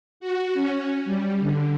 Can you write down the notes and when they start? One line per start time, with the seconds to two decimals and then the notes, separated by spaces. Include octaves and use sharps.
0.20 F#4
0.54 C#4
1.05 G3
1.40 D3